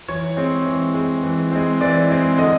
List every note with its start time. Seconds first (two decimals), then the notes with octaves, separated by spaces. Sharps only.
0.08 E3 C#5
0.37 G#3 C4
0.66 E3
0.94 G#3 C4
1.23 E3
1.52 G#3 C4
1.81 E3 D5
2.10 G#3 C4
2.38 D3 D#5